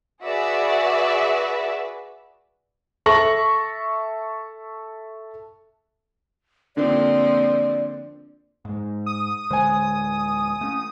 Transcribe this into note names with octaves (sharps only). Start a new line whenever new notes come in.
F#4 G#4 B4 D5 E5
A4 E5 C#6 A#6 F#7
D3 F3 A#3 C4 D4 D5
G#2 G#3
D#6
D1 D3 G#3 C5 G#5
A3 C#4